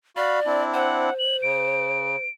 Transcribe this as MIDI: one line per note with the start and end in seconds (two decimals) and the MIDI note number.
0.17 0.40 66
0.17 0.64 74
0.17 0.40 77
0.17 0.40 83
0.46 1.10 60
0.46 1.10 62
0.46 1.10 64
0.73 2.24 72
0.73 1.14 78
1.19 1.37 102
1.43 2.16 49
1.43 2.30 98